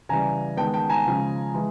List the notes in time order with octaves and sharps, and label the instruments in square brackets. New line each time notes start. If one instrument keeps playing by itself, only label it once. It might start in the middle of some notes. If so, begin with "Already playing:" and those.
[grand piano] C#3 E3 G3 G#5 A#5
D#3 G#3 B3 G5 A5
G5 A5
G#5 A#5
C#3 F3 G#3
E3 G#3